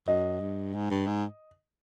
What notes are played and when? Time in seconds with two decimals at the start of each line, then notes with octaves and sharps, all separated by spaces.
0.07 F#2 D#5
0.40 G2
0.74 G#2
0.90 G2
1.07 G#2